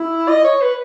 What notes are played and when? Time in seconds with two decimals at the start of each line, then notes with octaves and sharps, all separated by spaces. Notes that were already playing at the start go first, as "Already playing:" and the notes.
Already playing: E4
0.29 D#5
0.44 C#5
0.62 B4